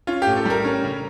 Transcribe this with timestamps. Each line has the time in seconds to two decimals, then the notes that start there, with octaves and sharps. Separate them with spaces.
0.07 C#4 F4
0.22 A2 G4
0.36 A4
0.45 G3 A#4
0.65 C#4
0.84 C#3